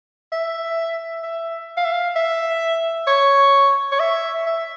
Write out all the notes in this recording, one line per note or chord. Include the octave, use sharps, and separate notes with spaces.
E5
E5
F5
E5
F5
E5
C#5
C#5
E5
E5